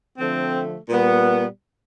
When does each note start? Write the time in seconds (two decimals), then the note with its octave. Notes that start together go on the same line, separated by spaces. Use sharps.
0.18 D3 F3 A3 C4
0.88 A#2 G3 B3